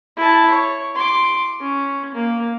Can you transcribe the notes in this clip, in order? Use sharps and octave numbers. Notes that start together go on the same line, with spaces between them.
E4 A5
C#5
C6 D6
C#4
A#3